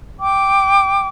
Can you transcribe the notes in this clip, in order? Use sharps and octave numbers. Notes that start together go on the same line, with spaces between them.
G5 D6